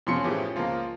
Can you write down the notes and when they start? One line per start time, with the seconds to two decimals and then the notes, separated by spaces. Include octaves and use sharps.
0.07 F2 E3 F3 C#4 C6 C#7
0.24 A2 E3 F3 C#4 G4 G#4
0.56 C#2 F3 A#3 F4